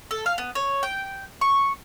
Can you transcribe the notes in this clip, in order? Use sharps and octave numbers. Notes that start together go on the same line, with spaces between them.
A4
F5
B3
C#5
G5
C#6